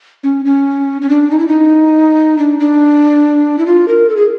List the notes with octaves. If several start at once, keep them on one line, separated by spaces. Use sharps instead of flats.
C#4
C#4
C#4
D4
D#4
E4
D#4
D4
D4
E4
F4
A#4
A4
G#4